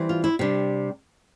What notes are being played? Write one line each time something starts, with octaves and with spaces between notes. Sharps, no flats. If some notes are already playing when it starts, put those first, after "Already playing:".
Already playing: E3 G3 C4
F4
E4
C3 G3 D4